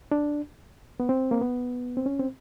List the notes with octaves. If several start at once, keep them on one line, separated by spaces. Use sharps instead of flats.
D4
B3
C4
A#3
B3
C4
C#4
C4